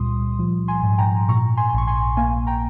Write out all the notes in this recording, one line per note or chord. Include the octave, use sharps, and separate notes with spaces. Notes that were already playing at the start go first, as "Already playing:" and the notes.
Already playing: C#2 A#2 G3 C6 D#6
F3
G#5 C6
G#2
G5 A#5
A#2 A#5 C#6
G#5 C6
A#1 C#6
G#5 C6
A#3 F5 G#5
G5 A#5